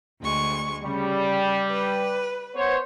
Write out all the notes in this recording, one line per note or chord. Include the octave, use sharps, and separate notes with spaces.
D2 G#3 C#6
C#3 G3
B4
B3 C5 C#5